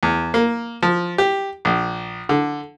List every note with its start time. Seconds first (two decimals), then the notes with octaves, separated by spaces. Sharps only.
0.03 E2
0.34 A#3
0.83 F3
1.18 G4
1.65 A#1
2.29 D3